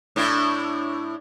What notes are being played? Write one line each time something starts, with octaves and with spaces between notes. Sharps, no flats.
A2 D4 E4